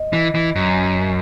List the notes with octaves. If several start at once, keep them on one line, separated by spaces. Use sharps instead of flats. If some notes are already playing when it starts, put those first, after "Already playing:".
Already playing: D#5
E3
E3
F#2